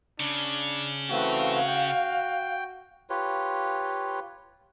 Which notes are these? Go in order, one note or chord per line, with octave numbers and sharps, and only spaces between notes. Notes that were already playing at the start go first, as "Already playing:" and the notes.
C#3 D4
E3 A3 C4 F#4 F5
G5
F4 G4 B4 C#5